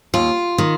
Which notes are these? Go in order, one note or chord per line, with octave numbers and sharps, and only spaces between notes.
D#2 F4
D#3